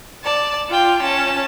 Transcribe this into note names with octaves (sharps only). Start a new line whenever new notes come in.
D5 A5
F4 G5
C#4 A5